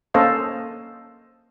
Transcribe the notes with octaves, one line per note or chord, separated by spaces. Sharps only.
A#3 C#4 A4 C5 D#5 F5